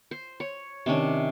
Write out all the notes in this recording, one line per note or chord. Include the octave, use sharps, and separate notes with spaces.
C5
C#5
C3 D#3 C#4 D4